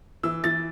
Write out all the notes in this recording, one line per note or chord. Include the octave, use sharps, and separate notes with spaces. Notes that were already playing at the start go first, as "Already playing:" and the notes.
E3 E6
E3 A6